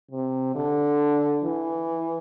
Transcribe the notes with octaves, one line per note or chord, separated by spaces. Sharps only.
C3
D3
E3